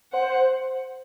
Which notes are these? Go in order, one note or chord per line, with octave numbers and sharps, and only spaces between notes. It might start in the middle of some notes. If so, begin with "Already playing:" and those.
C5 F#5